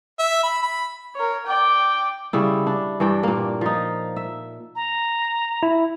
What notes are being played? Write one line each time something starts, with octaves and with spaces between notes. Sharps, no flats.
E5
B5
B5
A#4 C#5
D5 G5
C#3 G3 E4
D4
G2 E3 D4 G5
A#2 A#3
F3 D#4
E5
A#5
E4